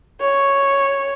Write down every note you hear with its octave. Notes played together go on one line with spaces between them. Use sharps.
C#5